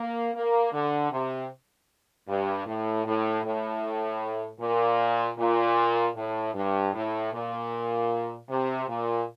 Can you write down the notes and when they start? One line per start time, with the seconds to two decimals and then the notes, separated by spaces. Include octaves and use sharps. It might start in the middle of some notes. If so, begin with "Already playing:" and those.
Already playing: A#3
0.34 A#3
0.72 D3
1.11 C3
2.28 G2
2.66 A2
3.05 A2
3.44 A2
4.60 A#2
5.38 A#2
6.16 A2
6.54 G2
6.94 A2
7.33 A#2
8.49 C3
8.88 A#2